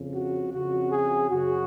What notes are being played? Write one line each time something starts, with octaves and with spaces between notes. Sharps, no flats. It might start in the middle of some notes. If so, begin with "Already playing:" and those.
Already playing: F2 C#3
F#4
F2 C#3 F#4
G#4
F#2 C#3 F#4